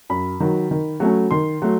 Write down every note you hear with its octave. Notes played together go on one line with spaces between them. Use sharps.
F#2 B5
D#3 F#3
D#3
F#3 A3 C#4
D#3 C6
F#3 A3